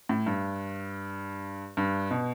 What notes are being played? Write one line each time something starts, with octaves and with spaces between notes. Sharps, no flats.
A2
G2
G2
B2